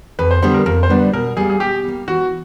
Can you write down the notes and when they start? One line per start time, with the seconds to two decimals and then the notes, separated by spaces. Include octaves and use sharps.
0.19 F2 B4
0.31 C5
0.42 D3 G3 B3 D4 C5
0.54 A#4
0.66 F2 A#4
0.83 C5
0.89 D3 G3 B3 D4 B4
1.13 B2 A#4
1.37 G3 A#3 G#4
1.50 G#4
1.60 B2 G4
1.84 G3 A#3
2.08 E3 F#4